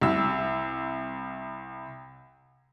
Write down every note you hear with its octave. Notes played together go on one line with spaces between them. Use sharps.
C2 E6